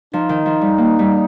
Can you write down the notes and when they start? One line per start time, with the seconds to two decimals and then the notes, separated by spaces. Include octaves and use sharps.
0.13 F3 D#4
0.29 D#3
0.46 F3
0.61 G3
0.78 A#3
0.99 G3